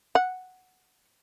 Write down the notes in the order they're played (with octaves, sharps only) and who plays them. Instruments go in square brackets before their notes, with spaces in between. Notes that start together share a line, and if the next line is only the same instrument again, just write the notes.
[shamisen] F#5